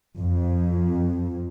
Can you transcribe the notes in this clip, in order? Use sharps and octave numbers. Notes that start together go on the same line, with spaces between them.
F2